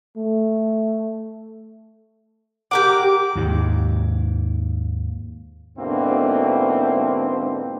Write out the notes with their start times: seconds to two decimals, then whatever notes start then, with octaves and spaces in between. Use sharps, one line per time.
0.17 A3
2.71 G4 A#4 F#5 D6
3.36 D#2 G#2
5.77 G#2 B2 D3 A#3 C4 E4